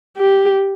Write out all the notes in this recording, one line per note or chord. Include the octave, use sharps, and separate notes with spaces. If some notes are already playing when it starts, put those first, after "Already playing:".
G4